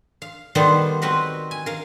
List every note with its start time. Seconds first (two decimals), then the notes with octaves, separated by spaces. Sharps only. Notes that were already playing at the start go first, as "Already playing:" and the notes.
0.22 F5
0.55 D#3 G3 B3 A4 C5
1.02 C4 F#4 A#4 B4
1.51 G#5
1.66 A#4 F5